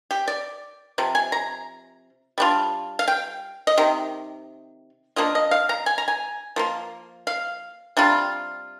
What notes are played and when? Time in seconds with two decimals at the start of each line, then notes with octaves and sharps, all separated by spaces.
0.11 G4
0.28 D5
0.98 C3 F3
1.15 G#5
1.32 A#5
2.38 G3 D4 F4
2.99 F5
3.08 G5
3.67 D#5
3.78 C3 D#3
5.16 F3 A#3 D4 F4 D#5
5.35 D#5
5.51 F5
5.69 A#5
5.86 G#5
5.98 A#5
6.08 G#5
6.56 F3 A#3 F4
7.27 F5
7.97 C3 G3 D4 F4